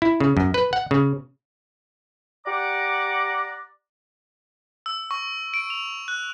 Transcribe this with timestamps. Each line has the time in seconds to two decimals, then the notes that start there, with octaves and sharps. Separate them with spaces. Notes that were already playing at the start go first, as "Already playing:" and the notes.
0.02 E4
0.20 C#3
0.37 F#2
0.54 B4
0.73 F#5
0.91 C#3
2.47 G4 D5 F#5 A#5 D6
4.86 E6
5.11 C#6
5.54 D7
5.70 F7
6.08 F#6